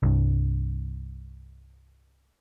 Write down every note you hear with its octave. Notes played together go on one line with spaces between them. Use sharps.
C2 G2